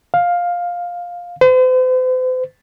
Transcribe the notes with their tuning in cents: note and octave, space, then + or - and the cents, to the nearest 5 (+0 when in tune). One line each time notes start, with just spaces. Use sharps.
F5 +10
C5 -40